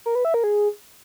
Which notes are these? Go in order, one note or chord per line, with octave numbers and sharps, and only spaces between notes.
A#4
B4
E5
A#4
G#4